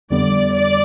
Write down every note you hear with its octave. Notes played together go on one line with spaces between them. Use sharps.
F2 D3 G3 B3 D5
D5